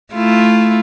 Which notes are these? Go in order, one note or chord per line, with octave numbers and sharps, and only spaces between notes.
A3 E4 F4